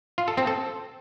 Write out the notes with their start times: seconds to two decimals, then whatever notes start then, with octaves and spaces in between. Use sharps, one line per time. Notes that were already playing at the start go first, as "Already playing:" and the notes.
0.18 F4
0.28 A4
0.37 C4
0.47 A4